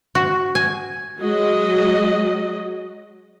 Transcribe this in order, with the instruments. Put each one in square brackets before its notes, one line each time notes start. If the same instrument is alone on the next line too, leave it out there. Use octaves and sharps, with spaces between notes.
[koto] F#4
G#5
[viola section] F#3 G#3 F#4 D#5